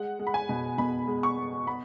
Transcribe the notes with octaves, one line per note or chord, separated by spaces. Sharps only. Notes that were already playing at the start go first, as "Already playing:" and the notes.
Already playing: G#3 F#5
G#3
B5
G#5
B2
B2 B5
G#3
C#6
B3
B3 B5